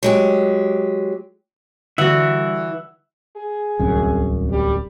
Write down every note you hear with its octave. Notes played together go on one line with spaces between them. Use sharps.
F#3 G#3 G4
D3 E3 G3 F#4 E5 F#5
G#4
D1 C2 F#2
G3